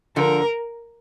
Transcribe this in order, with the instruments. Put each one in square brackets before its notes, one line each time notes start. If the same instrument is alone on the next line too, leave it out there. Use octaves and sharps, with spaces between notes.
[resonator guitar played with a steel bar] D3 F3 [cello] A#4